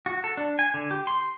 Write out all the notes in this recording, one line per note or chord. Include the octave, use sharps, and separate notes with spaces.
F#4
A4
D4
G#5
D3
G4
C6